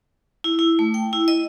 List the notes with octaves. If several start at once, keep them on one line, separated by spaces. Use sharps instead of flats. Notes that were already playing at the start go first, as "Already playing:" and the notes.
E4
E4
A3
G5
E4
D#5